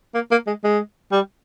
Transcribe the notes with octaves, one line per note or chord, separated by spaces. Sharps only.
A#3
A#3
G#3
G#3
G3